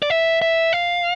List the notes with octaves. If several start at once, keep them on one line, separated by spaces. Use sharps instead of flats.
D5
E5
E5
F5